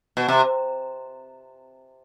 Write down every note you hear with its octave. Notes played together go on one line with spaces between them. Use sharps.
B2
C3